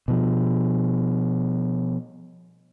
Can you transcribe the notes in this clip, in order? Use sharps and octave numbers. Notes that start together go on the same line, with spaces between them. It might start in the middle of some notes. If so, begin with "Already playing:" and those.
B2 F3